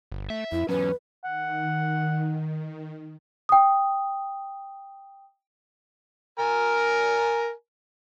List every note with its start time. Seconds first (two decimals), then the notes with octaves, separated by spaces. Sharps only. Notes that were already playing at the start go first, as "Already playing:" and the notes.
0.12 G1
0.30 A3 E5
0.52 F2 E4
0.69 E2 F#3 C#4 B4
1.25 D#3 F#5
3.49 G5 D#6
6.39 A#4 G#5 A#5